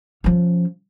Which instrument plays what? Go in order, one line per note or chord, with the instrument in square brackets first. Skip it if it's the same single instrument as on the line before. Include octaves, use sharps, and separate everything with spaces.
[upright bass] F3 C#4